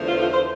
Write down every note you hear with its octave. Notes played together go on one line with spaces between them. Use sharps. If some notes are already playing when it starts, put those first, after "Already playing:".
Already playing: E2 D3 F3 A3
F4
F4
C5